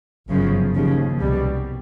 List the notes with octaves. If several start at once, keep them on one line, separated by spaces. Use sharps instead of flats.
G1 F#2 C#3 F3
D#2 C#3 F3
C2 B2 G3